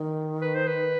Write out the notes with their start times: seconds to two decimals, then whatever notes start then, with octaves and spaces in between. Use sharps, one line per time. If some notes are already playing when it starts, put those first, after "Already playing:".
Already playing: D#3
0.42 B4
0.55 C5
0.67 B4